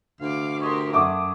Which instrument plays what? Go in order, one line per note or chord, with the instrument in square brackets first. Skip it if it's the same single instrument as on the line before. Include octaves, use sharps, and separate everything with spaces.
[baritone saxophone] D2 [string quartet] F5 D6
[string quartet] G4 A#4 [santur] C#5 D#5 C6
[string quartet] F#2 [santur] A3 F#5 D#6 [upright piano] D6